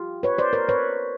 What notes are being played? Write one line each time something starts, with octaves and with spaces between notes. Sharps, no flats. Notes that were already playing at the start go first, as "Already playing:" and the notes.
Already playing: F4 G4
B4 C#5
C5 D5
A#4 C5
B4 C#5